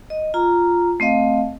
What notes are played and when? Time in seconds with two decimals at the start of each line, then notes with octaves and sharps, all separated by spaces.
0.10 D#5
0.34 F4 A#5
1.00 A3 C4 D#5 F5